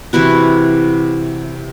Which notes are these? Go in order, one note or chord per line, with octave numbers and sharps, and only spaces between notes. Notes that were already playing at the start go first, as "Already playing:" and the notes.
C3 E3 E4 F#4